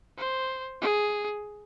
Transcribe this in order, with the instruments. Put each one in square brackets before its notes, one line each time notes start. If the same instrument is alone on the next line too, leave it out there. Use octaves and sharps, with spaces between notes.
[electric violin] C5
G#4